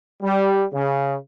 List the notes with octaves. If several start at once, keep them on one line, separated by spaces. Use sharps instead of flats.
G3
C#3